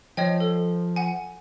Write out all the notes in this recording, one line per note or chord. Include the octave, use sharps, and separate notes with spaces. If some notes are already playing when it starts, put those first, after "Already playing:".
F3 C#5 D#5 G5
A4
F#5 G#5